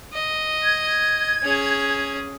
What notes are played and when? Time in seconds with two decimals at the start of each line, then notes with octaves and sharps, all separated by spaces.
0.13 D#5
0.63 G#6
1.43 C#4 G#4